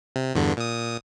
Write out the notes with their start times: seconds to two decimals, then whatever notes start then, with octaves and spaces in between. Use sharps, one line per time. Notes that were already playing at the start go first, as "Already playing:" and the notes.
0.16 C3
0.35 E2 G2 D3
0.57 A#2 D#6